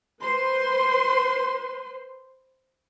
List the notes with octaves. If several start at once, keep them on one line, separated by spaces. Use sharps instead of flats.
B4 C5 C6